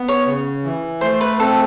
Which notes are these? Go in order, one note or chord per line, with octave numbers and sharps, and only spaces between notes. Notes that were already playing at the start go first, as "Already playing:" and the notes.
Already playing: B3
C#5
C#3
E3
A3 C5
B4
C4 A4